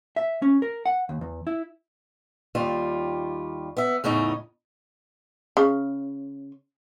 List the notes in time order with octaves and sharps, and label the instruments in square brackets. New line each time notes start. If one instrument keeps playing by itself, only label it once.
[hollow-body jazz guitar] E5
C#4
A#4
F#5
D#2
E2
E4
[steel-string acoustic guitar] D#2 G3 F4
B3 E5
E2 A2 C#3 D#4
[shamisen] C#3